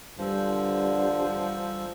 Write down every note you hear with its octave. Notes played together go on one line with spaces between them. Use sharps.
A1 G2 D3 F3 G3 E6